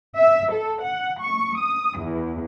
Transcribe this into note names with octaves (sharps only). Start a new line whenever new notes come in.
E5
A4
F#5
C#6
D#6
E2